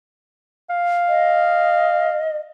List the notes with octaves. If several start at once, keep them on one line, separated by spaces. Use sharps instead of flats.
F5
D#5